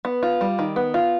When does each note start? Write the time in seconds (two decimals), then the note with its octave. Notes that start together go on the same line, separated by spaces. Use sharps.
0.05 B3
0.23 F4
0.41 G3
0.59 D#3
0.76 B3
0.94 F4